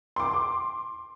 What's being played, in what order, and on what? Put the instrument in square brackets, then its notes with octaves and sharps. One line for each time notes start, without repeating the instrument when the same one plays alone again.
[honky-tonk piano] C6 D6